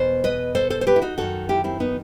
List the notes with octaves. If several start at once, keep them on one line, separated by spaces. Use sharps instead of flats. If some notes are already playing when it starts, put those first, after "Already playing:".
Already playing: E2 B2 C5
B4 D#5
A4 C5
A4 C5
C5
G4 B4
E4
D#4 F#4
F#2 D#3 F#4 A4
E4 G4
C4 E4
B3 D#4